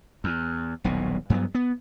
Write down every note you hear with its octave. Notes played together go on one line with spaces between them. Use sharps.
E2
D#1 B1 B2
G2 F#3 A3 B3
B3